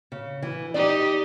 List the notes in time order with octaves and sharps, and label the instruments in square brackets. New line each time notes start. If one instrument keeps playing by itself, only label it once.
[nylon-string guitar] C#3
E3
[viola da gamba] D#4 G4 [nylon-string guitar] D5